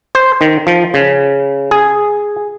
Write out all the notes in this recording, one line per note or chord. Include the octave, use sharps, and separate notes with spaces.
C5
D#3
F3
C#3
G#4